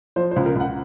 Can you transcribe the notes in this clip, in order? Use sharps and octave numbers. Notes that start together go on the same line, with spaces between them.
F3 C5
C5
C#2
A#4
C#2 F#5